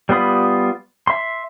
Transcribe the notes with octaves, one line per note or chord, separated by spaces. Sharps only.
G3 B3 F4 B5 D#6
E5 C6